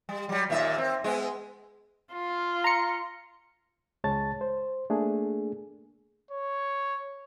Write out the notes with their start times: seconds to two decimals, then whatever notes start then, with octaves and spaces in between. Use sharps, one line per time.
0.09 G3
0.29 F#3 G3
0.50 D#2 A#2 E5
0.78 C4
1.04 G#3 B3
2.12 F4
2.64 A#5 C#7
4.04 C#2 G#3 C#5 A5 A6
4.41 C5
4.90 A3 A#3 D4 G#4
6.31 C#5